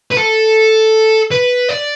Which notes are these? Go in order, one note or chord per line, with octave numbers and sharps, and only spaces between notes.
B4
A4
B4
D5